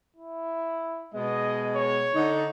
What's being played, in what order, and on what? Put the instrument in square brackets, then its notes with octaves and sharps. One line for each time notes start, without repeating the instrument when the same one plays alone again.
[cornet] E4
[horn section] B2 G#3 B3 [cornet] D#5
[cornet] C#5
[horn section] D3 D#4